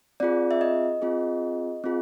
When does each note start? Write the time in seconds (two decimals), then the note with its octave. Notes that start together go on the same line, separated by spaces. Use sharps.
0.20 C4 F4 G#4 D5
0.51 E5
0.61 D#5
1.02 C4 F4 G#4
1.84 C4 F4 G#4